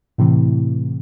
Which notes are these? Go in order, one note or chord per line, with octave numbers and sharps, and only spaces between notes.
A2 C3 E3